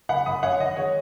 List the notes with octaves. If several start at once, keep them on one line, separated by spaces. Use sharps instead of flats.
F#1 F#5 B5
F#2 B5 D#6
F#2 C#5 F#5
D#3 D#5
G#3 C#5